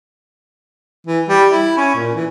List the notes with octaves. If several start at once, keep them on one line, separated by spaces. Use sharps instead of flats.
E3
G3
E4
C#4
A#2
E3